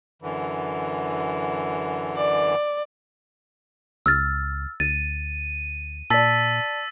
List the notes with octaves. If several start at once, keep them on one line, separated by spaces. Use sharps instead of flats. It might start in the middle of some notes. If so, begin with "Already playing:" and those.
F#2 D3 E3
D5
C#2 E6 F6 A6
D2 A6 D#7
A#2 D5 A5 E6 A6 B6